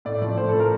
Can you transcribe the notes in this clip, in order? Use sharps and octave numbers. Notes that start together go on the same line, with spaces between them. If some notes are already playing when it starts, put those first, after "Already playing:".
A2 D5
F3 D5
A2 C5
A4
F3
A#4